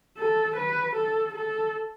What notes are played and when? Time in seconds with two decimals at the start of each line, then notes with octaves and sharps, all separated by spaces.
0.18 A4
0.57 B4
0.96 A4
1.34 A4